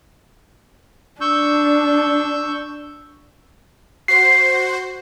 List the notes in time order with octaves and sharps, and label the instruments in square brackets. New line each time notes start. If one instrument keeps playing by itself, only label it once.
[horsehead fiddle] D4 [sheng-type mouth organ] C#6 E6 G6
[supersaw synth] F#4 C5 [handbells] C7